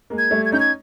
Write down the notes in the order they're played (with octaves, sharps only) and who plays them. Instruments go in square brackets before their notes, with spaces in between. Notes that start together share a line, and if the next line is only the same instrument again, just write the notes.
[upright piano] G#3 A#3
[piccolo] G#6
[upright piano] G3 A3
[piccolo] G#6
[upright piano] C#4 D#4 [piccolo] G6
[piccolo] G#6